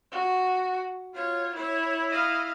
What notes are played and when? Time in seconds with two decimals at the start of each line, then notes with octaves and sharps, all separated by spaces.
0.12 F#4
1.14 F4 C#5
1.55 E4 C#5
2.10 D#5 F5